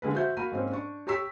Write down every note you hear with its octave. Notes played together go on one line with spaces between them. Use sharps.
D3 G#3 A#3 B4
F#4 C5 E5 G6
A#3 F#4 A#5 B5 D#7
G#2 A#3 C4 C#4
D4 C#6
G4 C#5 A#5 C#6 E6 B6